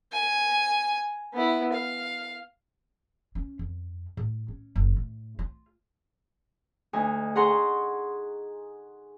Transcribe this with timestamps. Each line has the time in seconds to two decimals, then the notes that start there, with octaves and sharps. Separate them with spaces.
0.12 G#5
1.33 B3 E4
1.73 F5
3.35 C#4
3.59 F2
4.17 A2
4.48 C#4
4.76 F#1
4.96 A2
5.39 F4
6.93 D2 D#4 G#5
7.36 G#4 F#5 A#5 C6 C#6